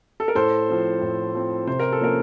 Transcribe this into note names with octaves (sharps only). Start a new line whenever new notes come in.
A4
A#4
A2 A4 C5
F3 C4
A2
F3 C4
C3 C5
A#4
A4
F3 A#3 C#4 A#4